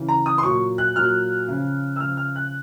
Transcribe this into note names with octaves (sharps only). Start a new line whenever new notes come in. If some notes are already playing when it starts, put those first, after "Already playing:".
Already playing: C#3 E3
A#5
D#6
C6
A#2 F#3 C#6
F#6
A#2 F#3 F6
C#3 F3
E6
C#3 F3 F6
F6
F#6